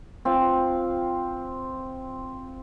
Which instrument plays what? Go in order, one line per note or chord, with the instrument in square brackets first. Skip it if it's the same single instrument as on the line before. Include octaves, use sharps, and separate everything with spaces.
[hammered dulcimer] C4 F4